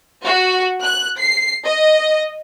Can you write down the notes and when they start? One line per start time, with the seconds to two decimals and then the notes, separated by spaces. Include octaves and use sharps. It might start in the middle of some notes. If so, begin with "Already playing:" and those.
0.24 F#4
0.82 F#6
1.18 C7
1.64 D#5